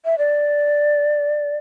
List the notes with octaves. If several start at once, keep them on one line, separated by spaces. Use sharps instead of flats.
E5
D5